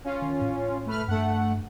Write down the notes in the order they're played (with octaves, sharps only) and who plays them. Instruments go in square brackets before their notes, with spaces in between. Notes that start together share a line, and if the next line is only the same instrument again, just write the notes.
[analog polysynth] C#4 F4
[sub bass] D#3
A2
[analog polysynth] A3 B4 F6
[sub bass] G2 [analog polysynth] A3 F#5